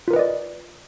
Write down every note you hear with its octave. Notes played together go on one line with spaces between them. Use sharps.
F4 A#4 B4 D5 D#5